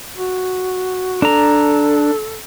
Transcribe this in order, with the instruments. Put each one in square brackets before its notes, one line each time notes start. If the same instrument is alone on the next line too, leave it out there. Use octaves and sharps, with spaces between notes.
[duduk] F#4
[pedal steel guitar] D4 A#5 [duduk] A4